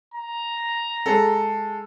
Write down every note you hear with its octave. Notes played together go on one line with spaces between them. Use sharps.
A#5
G#3 A4